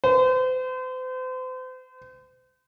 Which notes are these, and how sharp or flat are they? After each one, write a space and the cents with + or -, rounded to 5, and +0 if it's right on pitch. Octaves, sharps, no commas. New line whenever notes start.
C5 -40